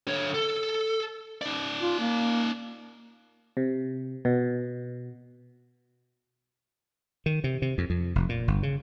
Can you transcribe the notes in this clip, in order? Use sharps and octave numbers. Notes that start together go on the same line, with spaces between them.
D3 C#5
A4
D#4 D5
F4
A#3
C3
B2
D#3
C3
C3
F2
F2
F1
A#2
G1
C#3